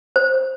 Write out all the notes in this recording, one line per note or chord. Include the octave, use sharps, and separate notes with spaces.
C5